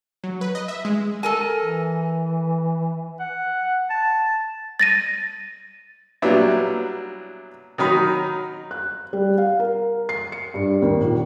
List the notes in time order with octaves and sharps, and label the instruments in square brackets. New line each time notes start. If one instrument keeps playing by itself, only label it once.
[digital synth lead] F#3
B4
D#5
E5
G#3
[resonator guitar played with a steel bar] A4 A#4 G#5
[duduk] E3
[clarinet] F#5
A5
[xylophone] A6 A#6 D#7
[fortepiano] A#2 F#3 G3 B3 D4 E4
D#3 F#3 D#4 B5
[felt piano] F#6
G3
F5
A#4
C7
C#7
G2
D#2
A#1